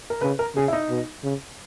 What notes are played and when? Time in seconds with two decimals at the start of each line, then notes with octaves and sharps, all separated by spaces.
0.10 A#4
0.21 C#3 B4
0.39 A#4
0.56 C#3 G#4
0.68 E4
0.73 D#4
0.90 B2
1.24 C#3